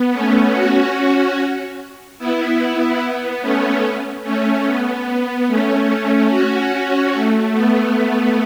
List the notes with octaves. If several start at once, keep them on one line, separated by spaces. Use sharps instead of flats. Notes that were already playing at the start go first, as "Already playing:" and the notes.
Already playing: B3
A3 C#4
C#4 F#4
B3 E4
B3
B3
A3 C#4
A3 C#4
B3
B3
A3 C#4
C#4 F#4
C#4 F#4
A3
B3